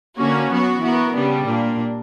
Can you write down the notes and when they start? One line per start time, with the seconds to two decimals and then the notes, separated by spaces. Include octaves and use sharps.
0.16 D3 A#3 C#4 F#4
0.49 F#3 B3 F#4
0.81 E3 B3 F#4 A#4
1.14 C#3 G3 B3 D4
1.47 A#2 A#3 D4